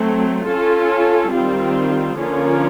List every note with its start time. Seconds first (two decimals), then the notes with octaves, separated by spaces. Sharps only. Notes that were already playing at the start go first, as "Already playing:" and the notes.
Already playing: F#3 A3 C4
0.46 C#4 F4 A4
1.32 D#3 G3 C4 F4
2.17 D3 F3 A#3 C#4 F4